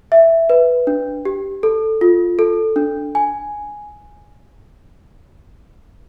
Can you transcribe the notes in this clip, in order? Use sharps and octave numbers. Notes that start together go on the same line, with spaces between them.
E5
B4
D4
G4
A4
F4
A4
D4
G#5